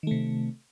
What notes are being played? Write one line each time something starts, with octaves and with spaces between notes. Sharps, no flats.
C3 D#3 A3